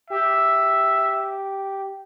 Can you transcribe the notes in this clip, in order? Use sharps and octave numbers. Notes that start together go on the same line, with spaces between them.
G4 E5